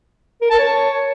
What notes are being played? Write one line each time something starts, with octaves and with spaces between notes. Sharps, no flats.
A#4
A5
C#5